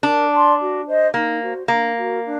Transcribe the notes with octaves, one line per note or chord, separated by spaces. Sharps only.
D4 A#4
D5 A5 C6
F#4
C5 D#5
A#3 D#4
F#4 C5
A#3 D4
F#4 A#4
D4